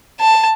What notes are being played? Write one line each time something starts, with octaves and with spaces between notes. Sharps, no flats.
A5